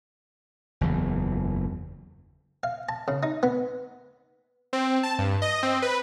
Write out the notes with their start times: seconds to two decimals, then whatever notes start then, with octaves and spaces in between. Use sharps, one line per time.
0.81 F#1 E2 E3
2.63 F5
2.89 A5
3.08 C#3
3.23 D#4
3.43 B3
4.73 C4
5.03 A5
5.19 G2
5.42 D#5
5.63 C4
5.82 B4